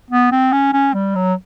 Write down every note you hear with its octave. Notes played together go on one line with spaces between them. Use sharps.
B3
C4
C#4
C#4
G3
F#3